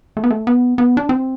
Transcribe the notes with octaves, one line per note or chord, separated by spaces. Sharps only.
A3
B3
A3
B3
B3
D4
C4